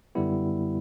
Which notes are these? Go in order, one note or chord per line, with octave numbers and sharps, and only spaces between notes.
F#2 D3 G3 B3 E4